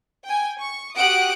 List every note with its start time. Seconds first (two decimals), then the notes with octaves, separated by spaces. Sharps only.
0.25 G5 G#5
0.59 C#6
0.96 F#4 G4 F#5 D#6 F#6 D7